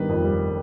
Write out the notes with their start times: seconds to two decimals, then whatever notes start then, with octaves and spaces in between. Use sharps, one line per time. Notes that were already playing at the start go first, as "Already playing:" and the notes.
Already playing: G1 D#3 G3 B4
0.09 F2
0.24 G3